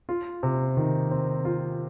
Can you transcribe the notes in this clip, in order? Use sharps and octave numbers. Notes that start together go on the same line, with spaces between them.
F4
C3
D#3
C4
F4